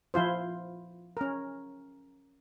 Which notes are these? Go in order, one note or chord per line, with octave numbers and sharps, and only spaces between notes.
F3 E4 F4 C5
C#4 A#4